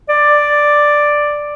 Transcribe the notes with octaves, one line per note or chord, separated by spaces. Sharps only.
D5